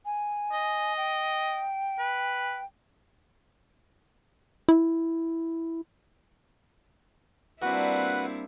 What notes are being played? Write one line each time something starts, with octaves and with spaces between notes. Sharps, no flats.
G#5
D#5
G5
B4
E4
G3 A#3 C4 D4 E4 F#4 B4 F#5